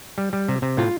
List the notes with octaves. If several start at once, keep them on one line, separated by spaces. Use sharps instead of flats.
G3
G3
C3
C3
A2 F4